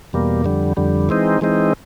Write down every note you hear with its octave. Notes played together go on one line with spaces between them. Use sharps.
E2 B2 G3 A#3
F2 D3 G3
F2 D3 G3
E3 G#3 C4 D#4
E3 G#3 C4 D#4